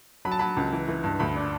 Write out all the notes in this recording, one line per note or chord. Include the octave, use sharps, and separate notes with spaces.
F#3 B5
A5
F#3 B5
C#2
E3
E3
G2
D2 B5
D4